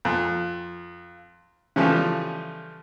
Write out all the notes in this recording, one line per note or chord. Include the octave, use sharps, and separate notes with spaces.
F2
C#3 E3 F3 G3 A3